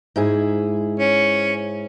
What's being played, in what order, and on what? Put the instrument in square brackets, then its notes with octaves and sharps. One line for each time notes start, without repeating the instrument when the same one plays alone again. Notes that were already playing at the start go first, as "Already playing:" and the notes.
[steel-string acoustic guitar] G#2 E4 G#4
[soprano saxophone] C#4